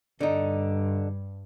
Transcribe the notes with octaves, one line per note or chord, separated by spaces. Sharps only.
G2 D3 D#4